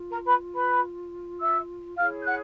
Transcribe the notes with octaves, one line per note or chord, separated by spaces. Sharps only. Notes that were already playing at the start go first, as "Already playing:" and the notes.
Already playing: F4
A#4 A#5
B4 B5
B4 B5
E5 E6
E4 G#4 C#5 F5 F6
G6
F#5 F#6